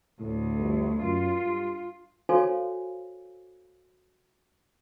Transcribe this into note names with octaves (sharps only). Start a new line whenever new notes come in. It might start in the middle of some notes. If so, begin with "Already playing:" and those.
D2 A2
G1
F#2 F4
G2
F#4 A4 C5 C#5 F5 G#5